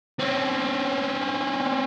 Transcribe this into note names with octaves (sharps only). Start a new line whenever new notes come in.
C4 C#4